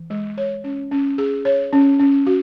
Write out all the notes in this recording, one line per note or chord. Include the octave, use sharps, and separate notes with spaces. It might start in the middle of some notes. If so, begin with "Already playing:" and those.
Already playing: E3
G#3
C#5
C#4
C#4
G#4
C#5
C#4
C#4
F#4